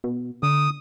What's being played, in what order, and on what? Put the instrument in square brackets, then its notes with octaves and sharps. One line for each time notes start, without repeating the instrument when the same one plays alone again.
[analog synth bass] B2
[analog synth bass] D3 [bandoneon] D#6